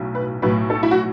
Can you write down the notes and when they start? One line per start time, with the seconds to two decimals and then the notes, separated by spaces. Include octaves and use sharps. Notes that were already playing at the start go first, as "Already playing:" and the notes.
Already playing: B1 A2 F#3
0.15 B4
0.42 B1 A2 F#3 B4
0.70 A4
0.83 E4
0.91 F#4